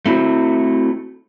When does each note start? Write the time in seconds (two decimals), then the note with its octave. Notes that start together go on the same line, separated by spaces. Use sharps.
0.06 A3 C4 E4 F#4